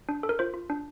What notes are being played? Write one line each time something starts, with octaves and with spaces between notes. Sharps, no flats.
D4
A4
A#4
F4 C5
F4
D4